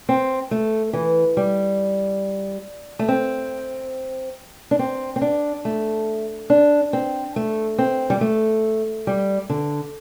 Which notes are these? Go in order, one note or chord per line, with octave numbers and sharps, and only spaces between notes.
C4
A3
E3
G3
A3
C4
D4
C4
C4
D4
A3
D4
C4
A3
C4
G3
A3
G3
D3